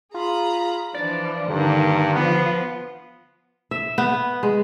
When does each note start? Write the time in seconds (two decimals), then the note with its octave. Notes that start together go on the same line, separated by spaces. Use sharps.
0.14 F4 G#4 A#5 B5
0.94 E3 F3 D4 D5
1.48 G2 D3 D#3 A#3
2.15 F3 B3 F4
3.71 E5
3.98 B3
4.43 G#3